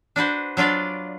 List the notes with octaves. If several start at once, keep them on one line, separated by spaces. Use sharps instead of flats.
D4 F#4 B4 C5
F#3 D4 F4 B4 D5